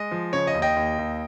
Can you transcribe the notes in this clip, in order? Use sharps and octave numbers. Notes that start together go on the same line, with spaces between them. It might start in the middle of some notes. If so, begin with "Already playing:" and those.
Already playing: G#3 D#5
F3
C#3 C#5
D#5
D#2
D#5 G5
D#2
D#2